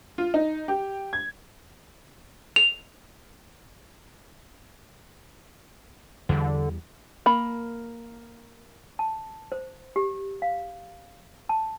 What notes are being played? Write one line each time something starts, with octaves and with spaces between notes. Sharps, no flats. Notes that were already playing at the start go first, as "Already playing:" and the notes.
F4
D#4
G4
G#6
F7
E2 D3 G3
A#3 B5
A5
C5
G4
F5
A5